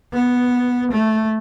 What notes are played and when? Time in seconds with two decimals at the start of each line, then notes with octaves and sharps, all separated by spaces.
0.12 B3
0.91 A3